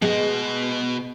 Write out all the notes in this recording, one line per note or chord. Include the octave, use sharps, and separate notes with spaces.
B2 G#3 B3 C5 D#5